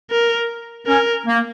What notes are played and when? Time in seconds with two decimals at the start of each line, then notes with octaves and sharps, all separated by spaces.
0.11 A#4
0.86 C#4 A#4
1.26 A#3